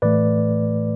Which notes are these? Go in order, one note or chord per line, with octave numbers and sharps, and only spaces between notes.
A2 E3 A3 B4 D5